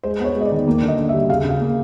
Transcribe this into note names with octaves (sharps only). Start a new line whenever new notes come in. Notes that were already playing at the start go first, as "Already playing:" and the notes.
G#3 C5
B3 C#5
G#3
D#5
D5
D#3
A#3
D3
D#5
D3
E5
G3
C#3 F5
C#3
F5
A#3